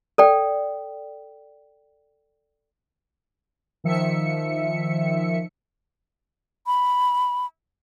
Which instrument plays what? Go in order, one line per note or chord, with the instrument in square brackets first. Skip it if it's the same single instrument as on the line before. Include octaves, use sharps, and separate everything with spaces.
[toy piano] A4 D5 G5
[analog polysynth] D#3 F3 E5 C#7
[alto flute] B5